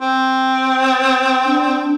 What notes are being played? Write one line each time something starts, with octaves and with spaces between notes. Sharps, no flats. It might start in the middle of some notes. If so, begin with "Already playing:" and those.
C4
D4